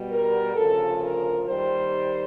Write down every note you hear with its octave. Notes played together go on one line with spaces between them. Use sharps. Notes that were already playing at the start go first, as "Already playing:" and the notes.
Already playing: B2 G3
A#4
D2 C#3 F3 A4
A#4
D#2 D#3 G3 C5